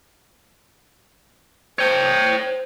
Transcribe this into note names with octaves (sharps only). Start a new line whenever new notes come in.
C5 C#5 G5